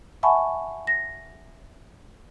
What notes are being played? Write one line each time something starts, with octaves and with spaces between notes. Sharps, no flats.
E5 F#5 G#5 A5 B5 C#6
A#6